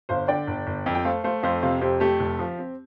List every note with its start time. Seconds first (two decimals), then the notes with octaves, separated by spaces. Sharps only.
0.09 G1 C5 F5
0.28 D3 D5 G5
0.48 G1
0.67 G1
0.86 F2
0.95 G5
1.05 A3 C5 F5
1.24 A3 C5 F5
1.43 F2 C5 F5
1.62 C3 C5 F5
1.81 F2 G4 C5
2.00 A3 G4
2.19 F1
2.39 F3
2.58 C4